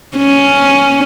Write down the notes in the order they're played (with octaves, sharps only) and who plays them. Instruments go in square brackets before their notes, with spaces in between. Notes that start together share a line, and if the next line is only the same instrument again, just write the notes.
[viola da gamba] C#4